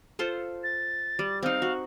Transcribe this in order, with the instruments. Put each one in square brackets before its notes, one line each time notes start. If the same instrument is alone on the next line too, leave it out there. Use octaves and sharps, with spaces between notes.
[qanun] F4 A4 C5
[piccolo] A6
[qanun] G3
[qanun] C4 D#4 [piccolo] F5
[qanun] F#4